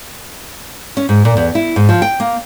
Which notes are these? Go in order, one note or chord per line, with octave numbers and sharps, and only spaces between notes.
C#4
G#2
A#2
E2
E4
G#2
F3
G5
A#3